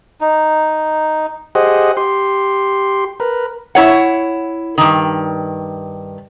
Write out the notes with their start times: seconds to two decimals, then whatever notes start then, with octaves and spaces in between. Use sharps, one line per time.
0.21 D#4
1.55 G4 G#4 C5 D#5 F#5
1.97 G4 C6
3.20 A#4 B4
3.75 E4 C#5 F#5
4.78 G2 D#3